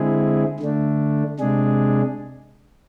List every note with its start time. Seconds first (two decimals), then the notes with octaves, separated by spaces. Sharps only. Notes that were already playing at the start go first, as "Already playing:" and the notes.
Already playing: D3 G#3 C4 E4 G#4
0.60 D3 A3 D4
1.40 C3 G#3 D4 G#4